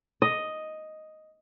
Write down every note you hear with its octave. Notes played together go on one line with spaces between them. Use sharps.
D#5